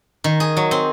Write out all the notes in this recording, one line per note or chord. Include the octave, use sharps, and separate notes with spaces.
D#3
G#4
F#3
C4